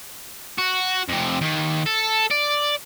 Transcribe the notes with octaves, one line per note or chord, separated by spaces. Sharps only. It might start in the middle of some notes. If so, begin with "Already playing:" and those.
F#4
F2 C3
D#2
A4
D5